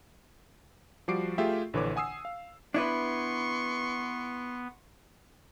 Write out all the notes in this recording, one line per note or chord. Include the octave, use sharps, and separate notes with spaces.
F3 G3 F#4 D6 C7 D7
A3 F4 G4 G#4 E5 G5
A#1 D3 E3 B4 C#5 D6
F#5 G#5 D#6 E6 C7
F5
B3 D4 E4 B4 C6 C#6